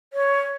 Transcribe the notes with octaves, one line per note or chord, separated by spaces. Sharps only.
C#5